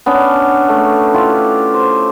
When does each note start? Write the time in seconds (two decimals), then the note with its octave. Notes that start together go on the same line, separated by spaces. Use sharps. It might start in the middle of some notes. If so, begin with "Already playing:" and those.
0.06 B3 C#4 D4
0.69 A3
1.14 E4 F4 G4
1.74 C5